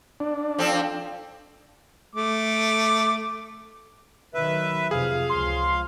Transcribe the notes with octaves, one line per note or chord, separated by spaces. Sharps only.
D4
F3 C4 A4
A3 D6
D#3 F#3 B4 E5
F2 C3 G#4 F5
C#2 F3 C6